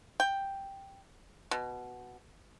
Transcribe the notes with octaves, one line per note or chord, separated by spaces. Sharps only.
G5
B2